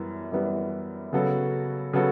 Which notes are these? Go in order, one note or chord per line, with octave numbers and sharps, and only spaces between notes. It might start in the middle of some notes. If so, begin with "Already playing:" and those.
Already playing: F#2 E3 G3 B3
F#2 E3 G3 B3
C#3 F#3 B3 F#4 A4
C#3 F#3 B3 F#4 A4